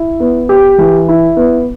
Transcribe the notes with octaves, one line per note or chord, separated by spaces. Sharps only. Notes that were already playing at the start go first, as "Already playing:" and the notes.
Already playing: E4
B3
G4
E3
E4
B3